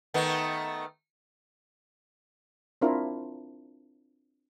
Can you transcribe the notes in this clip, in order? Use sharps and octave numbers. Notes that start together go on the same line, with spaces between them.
D#3 A3 B3
C4 D4 E4 F4 A#4